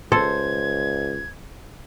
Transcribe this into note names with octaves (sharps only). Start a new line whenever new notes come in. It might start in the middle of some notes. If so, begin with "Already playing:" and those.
C#2 A4 C5 G#6